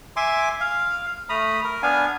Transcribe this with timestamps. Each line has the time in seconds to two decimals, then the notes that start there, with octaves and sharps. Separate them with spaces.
0.16 E5 G#5 C6 D6
0.60 F5
1.29 A3 A#5 B5 D#6
1.64 A#4
1.82 B3 D4 F5 G#5